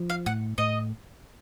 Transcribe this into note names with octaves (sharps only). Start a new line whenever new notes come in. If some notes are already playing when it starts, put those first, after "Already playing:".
Already playing: F3
F5
A2 F#5
A2 D#5